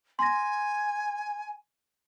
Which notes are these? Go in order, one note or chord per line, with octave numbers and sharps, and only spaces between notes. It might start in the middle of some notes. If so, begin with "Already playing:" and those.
G#5 C6 A#6